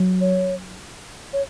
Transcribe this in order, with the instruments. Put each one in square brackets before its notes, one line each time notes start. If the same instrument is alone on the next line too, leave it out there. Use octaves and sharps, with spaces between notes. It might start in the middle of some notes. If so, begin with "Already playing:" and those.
Already playing: [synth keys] F#3
[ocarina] C#5
C#5